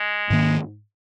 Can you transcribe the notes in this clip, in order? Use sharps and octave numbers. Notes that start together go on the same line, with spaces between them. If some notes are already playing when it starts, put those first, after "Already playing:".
Already playing: G#3
G#2 D#3 A#3